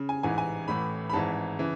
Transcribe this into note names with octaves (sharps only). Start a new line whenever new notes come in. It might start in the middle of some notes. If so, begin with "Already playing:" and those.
Already playing: C#3
G#5
A1 G#2 E3 G#5
G#5
A1 A2 E3 B5
B5
G#1 G#2 E3 A5
C#3 E3